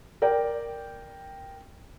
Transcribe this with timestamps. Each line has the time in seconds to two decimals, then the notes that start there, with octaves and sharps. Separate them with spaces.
0.22 A#4 D5 G5